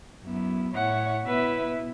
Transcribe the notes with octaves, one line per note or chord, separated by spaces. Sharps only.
F#2 F#3 B3 E4
A2 A3 E4 C#5 F#5
B2 B3 E4 B4 E5